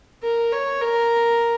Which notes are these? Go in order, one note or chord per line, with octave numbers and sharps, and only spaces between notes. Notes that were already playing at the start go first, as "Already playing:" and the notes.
A#4
C#5
A#4